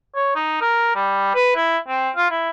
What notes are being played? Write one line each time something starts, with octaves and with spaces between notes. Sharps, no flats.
C#5
D#4
A#4
G3
B4
E4
C4
F4
E4